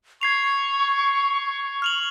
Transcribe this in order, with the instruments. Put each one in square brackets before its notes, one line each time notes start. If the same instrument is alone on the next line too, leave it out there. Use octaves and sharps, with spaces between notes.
[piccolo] C#6 [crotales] G#6 C7 F7
[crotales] F6 F7 F#7